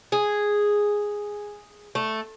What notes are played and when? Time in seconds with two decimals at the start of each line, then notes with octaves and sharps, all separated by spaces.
0.12 G#4
1.95 A3